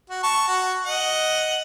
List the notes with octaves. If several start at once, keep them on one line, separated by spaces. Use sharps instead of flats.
F#4
A5 C#6
F#4
D#5 F#5